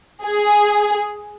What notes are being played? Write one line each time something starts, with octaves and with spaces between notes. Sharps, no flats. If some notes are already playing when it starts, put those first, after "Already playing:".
G#4